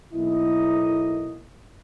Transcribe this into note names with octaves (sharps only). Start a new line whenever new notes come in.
B1 A#3 E4 D#5